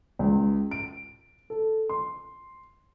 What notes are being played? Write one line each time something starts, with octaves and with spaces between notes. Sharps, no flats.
C#2
D7
A4
C6